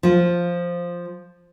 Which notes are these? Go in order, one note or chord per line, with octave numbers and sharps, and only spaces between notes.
F3 F4